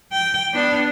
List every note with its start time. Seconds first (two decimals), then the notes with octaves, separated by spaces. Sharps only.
0.13 G5
0.54 B3 D4